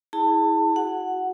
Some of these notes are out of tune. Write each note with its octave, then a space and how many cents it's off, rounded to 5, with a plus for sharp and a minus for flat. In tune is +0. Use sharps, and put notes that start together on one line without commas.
E4 -25 G#4 +0 A5 +25
F#4 +0 F#5 +0